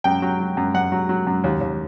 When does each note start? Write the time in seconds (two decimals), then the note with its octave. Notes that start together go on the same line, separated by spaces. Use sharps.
0.04 F#2 G5
0.22 F#3
0.40 F#3
0.57 F#2
0.74 F#2 F#5
0.92 F#3
1.09 F#3
1.27 F#2
1.44 D#2
1.61 D#2